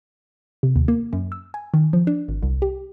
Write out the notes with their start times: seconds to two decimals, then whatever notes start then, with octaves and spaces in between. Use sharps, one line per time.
0.63 C3
0.76 D#2
0.88 A#3
1.13 F#2
1.32 E6
1.54 G#5
1.74 D#3
1.93 F3
2.07 D4
2.28 G#1
2.42 C2
2.62 G4